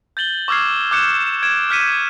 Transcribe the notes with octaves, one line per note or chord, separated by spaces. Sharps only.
G6 A6 F#7 G7
C#6 D6 E6 F6 G#6 C7
D6 F#6 G6 C#7 E7
G#6 D7 E7
F6 G6 B6 C#7 D#7